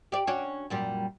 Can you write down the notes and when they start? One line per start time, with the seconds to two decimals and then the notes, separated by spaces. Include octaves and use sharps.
0.12 G4 D5
0.27 C#4 D4 F#4
0.70 F#2 A#2 G3